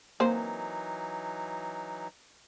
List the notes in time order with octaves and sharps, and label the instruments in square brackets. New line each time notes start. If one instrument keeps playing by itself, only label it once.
[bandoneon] E3 F#3 D#4 [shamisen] A#3 C4 C5